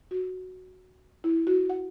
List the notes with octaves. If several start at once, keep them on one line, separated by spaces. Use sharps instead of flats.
F#4
E4
F#4
F#5